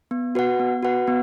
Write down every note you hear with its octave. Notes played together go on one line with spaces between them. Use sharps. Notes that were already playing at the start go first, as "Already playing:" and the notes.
B3
F#4 B4 F#5
B3
F#4 B4 F#5
B3